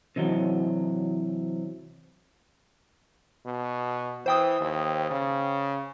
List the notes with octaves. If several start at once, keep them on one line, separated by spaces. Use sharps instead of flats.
C3 E3 F#3
B2
E3 C5 G5 D#6
D#2
C#3